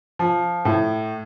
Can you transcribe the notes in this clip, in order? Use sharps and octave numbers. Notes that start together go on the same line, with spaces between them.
F3
A2